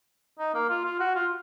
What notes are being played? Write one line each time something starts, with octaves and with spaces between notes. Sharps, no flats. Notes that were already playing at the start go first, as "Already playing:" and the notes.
D#4
A#3
F4
F4
F#4
F4